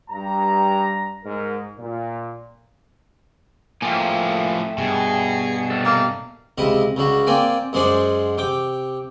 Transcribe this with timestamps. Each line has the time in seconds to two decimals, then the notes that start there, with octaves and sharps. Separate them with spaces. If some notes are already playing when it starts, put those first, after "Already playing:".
0.10 G2 A#5
1.24 G#2 A#4
1.79 A#2
3.82 A2 F3 A#3 E5 G5 G#5
4.30 A3
4.78 G2 B2 G#4
5.70 C3 G3 A4
5.85 A#3
6.58 C#2 C3 E4 D#5
6.96 C#2 D3 F#4
7.27 A#3 C4 D5 G5 G#5
7.73 F#2 G#3 G#4 C5 D5 F#5
8.38 C3 G5 D6